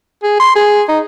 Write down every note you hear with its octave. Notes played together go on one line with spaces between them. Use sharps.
G#4
C6
G#4
D#4